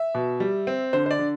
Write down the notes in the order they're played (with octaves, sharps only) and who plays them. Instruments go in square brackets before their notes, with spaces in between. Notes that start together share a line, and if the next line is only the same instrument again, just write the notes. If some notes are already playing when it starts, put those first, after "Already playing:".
Already playing: [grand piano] E5
B2
G3
C4
D3 C5
C5
D5
D3